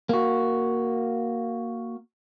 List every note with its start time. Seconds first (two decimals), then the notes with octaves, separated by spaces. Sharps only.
0.09 A#3 F#4